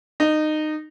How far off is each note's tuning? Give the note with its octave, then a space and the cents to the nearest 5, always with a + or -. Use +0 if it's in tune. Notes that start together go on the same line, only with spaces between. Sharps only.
D#4 -20